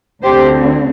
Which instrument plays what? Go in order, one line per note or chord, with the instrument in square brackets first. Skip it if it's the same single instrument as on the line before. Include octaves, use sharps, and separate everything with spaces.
[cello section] D2 D3 C4 G4 C5